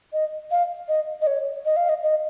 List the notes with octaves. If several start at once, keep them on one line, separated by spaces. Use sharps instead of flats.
D#5
F5
D#5
D#5
C#5
D#5
F5
D#5
D#5